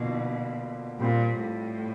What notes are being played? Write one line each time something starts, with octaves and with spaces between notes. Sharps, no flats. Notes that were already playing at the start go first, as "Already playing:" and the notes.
Already playing: B2 D3 F3 A#3 D#4
A#2 G3 C4 F4
A2